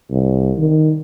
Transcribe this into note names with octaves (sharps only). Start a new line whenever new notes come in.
C2
D#3